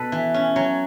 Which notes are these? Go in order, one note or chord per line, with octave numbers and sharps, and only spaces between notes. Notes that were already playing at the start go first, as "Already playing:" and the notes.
Already playing: B2 A4 B4
E3
C#4
F#3 C#5